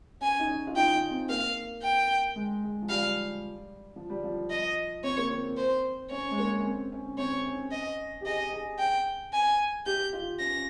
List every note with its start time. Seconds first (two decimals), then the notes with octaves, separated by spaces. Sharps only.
0.21 C#4 G#5
0.40 D#4
0.48 C#4
0.67 F4
0.76 D#4 G5
0.93 D#4
1.11 C4
1.29 A#3 F5
1.83 G5
2.36 G#3
2.63 G#3
2.82 F3
2.89 G3 F5
3.96 F3
4.10 G3
4.24 F3
4.50 D#5
5.03 C4 C#5
5.18 A#3
5.31 C4
5.57 C5
6.10 C#4 C#5
6.31 G#3
6.38 A#3
6.61 C#4
6.64 C4
6.92 C#4
7.18 C4 C#5
7.46 C#4
7.71 D#5
8.21 G4
8.26 G#4 D#5
8.53 G#4
8.79 G5
9.33 G#5
9.86 G4 G6
10.13 F4
10.39 C#4 A#6